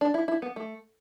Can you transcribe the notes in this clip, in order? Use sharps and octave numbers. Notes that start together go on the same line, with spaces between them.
D4
E4
E4
B3
A3